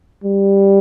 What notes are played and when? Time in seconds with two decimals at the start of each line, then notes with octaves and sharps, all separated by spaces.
0.24 G3